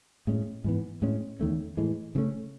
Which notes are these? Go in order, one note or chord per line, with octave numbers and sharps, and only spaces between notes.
A2 G#3 C#4
G#2 E3 B3
A2 G#3 C#4
E2 D#3 A3 C#4
A2 E3 G#3
C#3 E3 A3 C#4